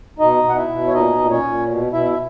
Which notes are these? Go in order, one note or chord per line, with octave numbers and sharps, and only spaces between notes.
B2 D#4 D#5
B2
F#5
E4 E5
B2
C#5
A#2 D#4 D#5
A#2
C#4 C#5
A#2
B2
B2 E4 E5
E5